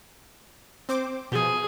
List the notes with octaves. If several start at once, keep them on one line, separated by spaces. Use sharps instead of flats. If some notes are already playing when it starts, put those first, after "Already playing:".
C4 C5 D6
B2 F3 G#4